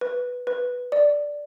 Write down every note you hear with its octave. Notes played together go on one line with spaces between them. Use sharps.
B4
B4
D5